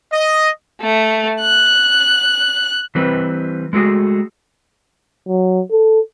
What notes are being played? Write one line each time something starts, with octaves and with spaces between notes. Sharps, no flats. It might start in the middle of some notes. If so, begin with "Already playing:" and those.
D#5
A3
F#6
E3 G3 C4 B4
G#3 A3 F#4 G#4
F#3
A4